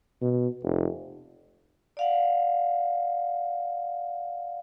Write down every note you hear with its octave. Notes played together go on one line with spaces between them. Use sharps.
B2
F1
D5 F5 F#5